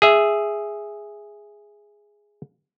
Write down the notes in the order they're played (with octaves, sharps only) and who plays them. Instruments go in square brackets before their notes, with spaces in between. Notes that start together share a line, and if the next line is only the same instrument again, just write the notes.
[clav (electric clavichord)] G#4 E5